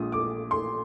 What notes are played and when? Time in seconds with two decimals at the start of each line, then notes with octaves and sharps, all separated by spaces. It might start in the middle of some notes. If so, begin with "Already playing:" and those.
Already playing: A#1 A#2 G#3 D#6
0.12 D6
0.51 C6